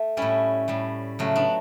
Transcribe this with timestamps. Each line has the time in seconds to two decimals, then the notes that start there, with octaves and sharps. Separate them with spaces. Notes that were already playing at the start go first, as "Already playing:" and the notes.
Already playing: A3
0.17 A2 G3 C#4 E4
0.68 A2 G3
1.19 C#3 F#3 A3
1.36 B3 D4